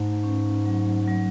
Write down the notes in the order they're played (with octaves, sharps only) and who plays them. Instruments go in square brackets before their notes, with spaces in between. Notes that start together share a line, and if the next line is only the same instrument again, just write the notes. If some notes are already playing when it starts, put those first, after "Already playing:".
Already playing: [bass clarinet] G#2 [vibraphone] A3
[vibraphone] C#4
F#3
F#3